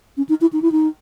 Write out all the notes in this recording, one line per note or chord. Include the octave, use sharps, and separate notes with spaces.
C#4
D#4
E4
D#4
E4
D#4